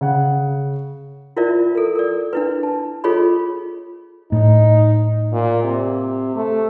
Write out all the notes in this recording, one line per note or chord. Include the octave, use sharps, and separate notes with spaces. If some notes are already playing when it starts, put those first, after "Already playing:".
C#3 F#5
E4 F4 A#4 C5 D5 E5
A4 A#4
A#4 D5
D4 E4 B4
A5
F4 G#4 A4 C#5 D#5 B5
A2 D#4
A#2
C3
A3